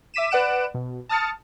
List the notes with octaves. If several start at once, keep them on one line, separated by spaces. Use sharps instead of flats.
E5 D6 B6 D#7 E7
B4 D5 F#5 F#6 D7 E7
B2
A5 D#6 F6 A6 C#7